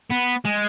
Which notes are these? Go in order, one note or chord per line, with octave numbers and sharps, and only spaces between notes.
B3
G#3